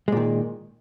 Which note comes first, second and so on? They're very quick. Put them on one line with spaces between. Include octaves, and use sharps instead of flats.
G#3 A#2 D#3